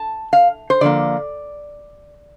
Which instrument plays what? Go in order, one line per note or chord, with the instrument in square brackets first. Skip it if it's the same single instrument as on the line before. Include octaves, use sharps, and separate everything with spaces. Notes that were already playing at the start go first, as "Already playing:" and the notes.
Already playing: [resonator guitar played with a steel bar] A5
F5
C5
D3 F3 A#3 D5